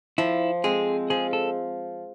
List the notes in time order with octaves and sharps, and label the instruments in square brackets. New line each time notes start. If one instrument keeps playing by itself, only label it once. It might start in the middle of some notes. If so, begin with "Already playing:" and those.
[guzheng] F3 [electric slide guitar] E4
[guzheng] G#3 C4 [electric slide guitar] G#4
[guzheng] F3 [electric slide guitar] G#4
[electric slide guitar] A4